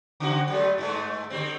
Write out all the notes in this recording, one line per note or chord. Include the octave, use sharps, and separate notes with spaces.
C#3 C4 F#4
F#3 G#3 A3
G2 G#3 A3
D3 G3 C4